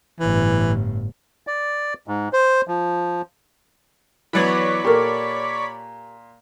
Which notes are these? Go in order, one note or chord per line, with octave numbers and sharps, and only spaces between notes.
G1 A2 E3
D5
G#2
C5
F3
E3 F#3 B3 C#5 D5 B5
A#2 G4 A4 A#4